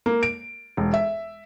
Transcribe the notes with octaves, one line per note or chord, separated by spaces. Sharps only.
A#3
D7
E1
E5